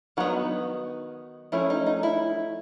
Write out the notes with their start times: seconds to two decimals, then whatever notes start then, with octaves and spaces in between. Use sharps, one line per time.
0.17 D#3 F#3 F#4
0.20 B3 D#4
1.52 F3 A3 C#4 E4
1.70 D#4
1.86 D#4
2.03 E4